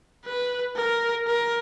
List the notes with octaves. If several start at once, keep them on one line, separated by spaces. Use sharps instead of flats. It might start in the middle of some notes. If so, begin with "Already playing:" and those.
B4
A#4
A#4